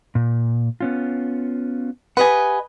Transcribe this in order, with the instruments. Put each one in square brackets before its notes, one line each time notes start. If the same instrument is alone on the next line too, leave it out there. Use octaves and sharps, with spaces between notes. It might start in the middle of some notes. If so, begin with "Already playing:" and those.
[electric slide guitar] A#2
B3 C#4 F4
[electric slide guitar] G4 F#5 [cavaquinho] B4 D#5 G#5